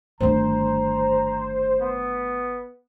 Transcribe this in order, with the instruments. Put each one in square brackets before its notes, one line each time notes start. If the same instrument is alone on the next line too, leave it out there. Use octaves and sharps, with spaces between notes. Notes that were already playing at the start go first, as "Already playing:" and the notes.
[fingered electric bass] G1 G2 D#3 [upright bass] A3 D4 [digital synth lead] C5 [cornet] A#5
[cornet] B3